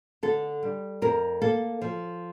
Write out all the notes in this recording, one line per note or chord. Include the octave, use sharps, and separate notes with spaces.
D3 A4
G3
F2 A#4
A#3 A4
F3